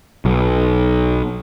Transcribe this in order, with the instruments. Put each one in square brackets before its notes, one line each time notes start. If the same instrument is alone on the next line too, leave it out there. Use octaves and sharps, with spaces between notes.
[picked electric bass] B1